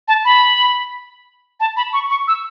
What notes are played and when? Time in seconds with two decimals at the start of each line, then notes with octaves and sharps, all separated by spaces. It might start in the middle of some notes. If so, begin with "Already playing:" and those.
0.08 A5
0.25 B5
1.60 A5
1.77 B5
1.93 C#6
2.10 C#6
2.28 E6